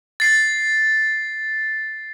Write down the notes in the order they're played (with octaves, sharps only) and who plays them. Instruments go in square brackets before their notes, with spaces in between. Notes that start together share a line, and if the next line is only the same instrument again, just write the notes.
[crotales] A6 C7